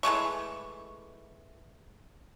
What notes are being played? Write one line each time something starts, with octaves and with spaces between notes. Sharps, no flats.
E3 G#3 A3 C#6